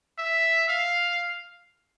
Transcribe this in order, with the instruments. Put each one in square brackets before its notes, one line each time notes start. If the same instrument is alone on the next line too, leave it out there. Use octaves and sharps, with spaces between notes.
[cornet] E5
F5